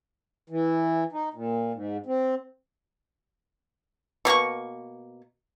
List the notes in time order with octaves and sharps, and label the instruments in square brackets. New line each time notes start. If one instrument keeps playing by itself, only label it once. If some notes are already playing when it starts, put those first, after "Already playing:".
[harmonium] E3
D#4
A#2
G#2
C4
[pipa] B2 A#3 C4 C#6